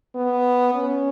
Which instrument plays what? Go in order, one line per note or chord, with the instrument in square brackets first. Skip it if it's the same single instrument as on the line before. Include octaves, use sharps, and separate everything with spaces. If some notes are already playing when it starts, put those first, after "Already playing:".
[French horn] B3
C#4